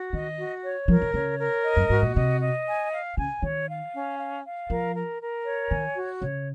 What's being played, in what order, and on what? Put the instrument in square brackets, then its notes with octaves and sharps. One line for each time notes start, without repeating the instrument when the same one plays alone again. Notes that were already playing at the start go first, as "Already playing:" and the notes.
Already playing: [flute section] F#4
[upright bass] D#3 [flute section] D#5
[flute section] F#4
C#5
[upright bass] F3 [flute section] A#4
[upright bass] D#3
[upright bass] C#3 [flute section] C#5
[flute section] A#4
D#5
[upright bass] F#2
[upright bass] G#2 [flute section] F#4
[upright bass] A#2
[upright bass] C3 [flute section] D#5
[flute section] D#5
G#5
F5
[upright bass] C#3 [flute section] G#5
[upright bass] D#3 [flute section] C#5
[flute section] F5
C#4
F5
F5
[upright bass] F3 [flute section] A#4
[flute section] A#4
A#4
C#5
[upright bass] D#3 [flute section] G#5
[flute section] F#4
[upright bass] C#3 [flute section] C#5